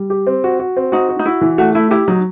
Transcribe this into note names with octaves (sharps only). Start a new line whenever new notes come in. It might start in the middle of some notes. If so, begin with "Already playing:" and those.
Already playing: G3
G4
C4
F#4
F#4
C4
D#4 F#4
F#4
D#4
E4 F#4
E3
A3 F#4
A3 E4
E4 G4
F#3 D#4